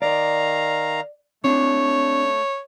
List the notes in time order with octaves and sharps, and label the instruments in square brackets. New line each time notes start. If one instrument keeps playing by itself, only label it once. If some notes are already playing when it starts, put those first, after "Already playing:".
[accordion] D#3 F5 A#5 [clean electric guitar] D5
[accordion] A3 [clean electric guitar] C4 D4 [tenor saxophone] C#5